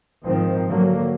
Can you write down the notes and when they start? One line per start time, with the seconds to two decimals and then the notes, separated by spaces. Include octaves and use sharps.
0.24 G#2 D#3 F3 C4
0.69 D3 F#3 A#3